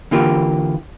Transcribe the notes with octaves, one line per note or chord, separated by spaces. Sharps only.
D3 E3 A#3 F4 G4